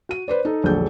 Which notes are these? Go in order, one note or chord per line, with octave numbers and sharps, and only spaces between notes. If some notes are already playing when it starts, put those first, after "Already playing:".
F#4 D#7
B4 C5 D5
D#4 A4
E1 A#1 D3 F#3 A4 G6